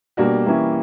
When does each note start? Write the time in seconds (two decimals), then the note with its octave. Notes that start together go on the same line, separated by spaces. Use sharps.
0.17 B2 G3 A#3 D4 F#4
0.46 E3 G3 A#3 C#4 E4